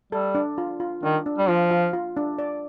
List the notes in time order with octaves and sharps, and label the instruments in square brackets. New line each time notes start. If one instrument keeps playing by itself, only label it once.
[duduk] G3 [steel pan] A4
[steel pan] D4
F4
F4
[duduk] D#3 [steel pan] D4
[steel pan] D4
[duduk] G3
[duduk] F3 [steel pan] F4
[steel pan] F4
F4
D4
D5